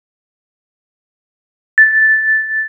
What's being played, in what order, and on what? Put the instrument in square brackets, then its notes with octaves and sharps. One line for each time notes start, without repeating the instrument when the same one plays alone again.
[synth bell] A6